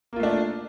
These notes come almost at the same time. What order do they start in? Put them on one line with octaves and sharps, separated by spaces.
A#3 F4 A3 D4